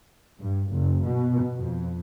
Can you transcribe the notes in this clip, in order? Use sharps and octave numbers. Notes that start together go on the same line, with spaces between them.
G2
F#1
B2
F2